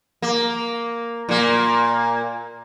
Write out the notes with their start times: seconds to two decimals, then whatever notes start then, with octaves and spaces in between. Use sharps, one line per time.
0.22 A#3
1.29 A#2 A#3